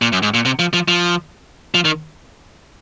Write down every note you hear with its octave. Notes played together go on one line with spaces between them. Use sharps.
A#2
F#2
G#2
A#2
C3
F3
F3
F3
F3
D#3